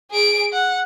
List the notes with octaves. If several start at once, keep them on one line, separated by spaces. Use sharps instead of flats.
G#4 D7
F#5